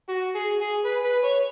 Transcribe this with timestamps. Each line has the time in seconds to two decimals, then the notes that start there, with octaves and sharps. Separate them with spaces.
0.09 F#4
0.35 G#4
0.60 G#4
0.85 B4
1.04 B4
1.24 C#5